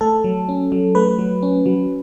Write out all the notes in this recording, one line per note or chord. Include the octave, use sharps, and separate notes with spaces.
A3 A4
F#3
C#4
F#3
A3 B4
F#3
C#4
F#3